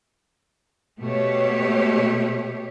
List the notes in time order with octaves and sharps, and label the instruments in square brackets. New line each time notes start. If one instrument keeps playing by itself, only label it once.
[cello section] B2 A3 G4 C#5